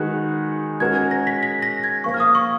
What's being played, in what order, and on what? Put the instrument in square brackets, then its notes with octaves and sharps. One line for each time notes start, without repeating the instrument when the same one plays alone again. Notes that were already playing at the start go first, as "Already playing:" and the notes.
Already playing: [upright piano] D#3 G#3 D#4 F#4 B4 [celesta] F#6
[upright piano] G#3 C#4 F#4 A#4 [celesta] G#6
[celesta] G#6
A#6
B6
B6
A#6
G#6
[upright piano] F3 A#3 F4 [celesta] C#6
[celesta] F6
D#6
C#6